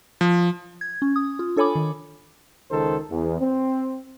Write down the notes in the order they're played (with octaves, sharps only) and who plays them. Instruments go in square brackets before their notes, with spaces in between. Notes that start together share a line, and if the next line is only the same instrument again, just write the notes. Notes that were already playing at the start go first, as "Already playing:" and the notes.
[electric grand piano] F3
[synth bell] G#6
C#4
D#6
F4
D4 A4 C#5 G#5 B5 D6
D#3
[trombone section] C#2 D#3 A4 C5
E2
C4